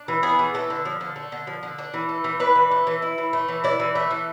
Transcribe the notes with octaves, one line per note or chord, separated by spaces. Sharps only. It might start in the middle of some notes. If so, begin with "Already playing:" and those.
Already playing: D4
E3
B3 G#4
E3
A3 A4
D3
F3
D3
A3
D3
F3
D3
D4
E3
A3
E3
D4 B4
E3
A3
E3
E4
E3
A3
E3
E4 D5
E3
A3 E5
E3